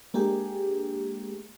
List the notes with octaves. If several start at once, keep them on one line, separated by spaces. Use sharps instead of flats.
G#3 A#3 D4 G4 G#4